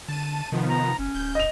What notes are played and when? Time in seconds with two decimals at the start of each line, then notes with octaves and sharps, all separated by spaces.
0.08 D3 A5 D#7
0.52 C3 D#3 F3 B3
0.70 A#5
0.99 F#1 C#4
1.15 D1 G6
1.35 D#5 F7